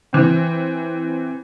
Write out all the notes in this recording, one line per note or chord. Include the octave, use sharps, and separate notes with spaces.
E3 C4